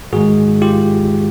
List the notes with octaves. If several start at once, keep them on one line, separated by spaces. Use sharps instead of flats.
G#2 D#3 G#3 F#4 G#4
F4 G4